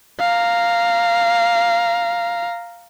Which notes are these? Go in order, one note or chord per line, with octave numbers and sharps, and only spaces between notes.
F5 A#5